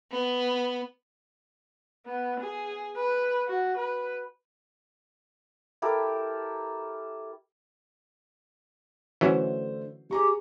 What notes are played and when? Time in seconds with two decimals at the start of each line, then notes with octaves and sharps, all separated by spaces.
0.12 B3
2.06 B3
2.40 G#4
2.97 B4
3.47 F#4
3.77 B4
5.82 E4 G4 A4 A#4
9.21 D3 E3 F#3 A3 C#4 C5
10.11 G4 G#4 A#5 C#6